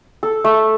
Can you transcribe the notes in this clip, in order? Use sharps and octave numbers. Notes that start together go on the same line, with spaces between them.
A4
A3